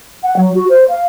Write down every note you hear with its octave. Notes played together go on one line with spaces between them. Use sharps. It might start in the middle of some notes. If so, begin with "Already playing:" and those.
F#5
F#3
F#4
C5
F5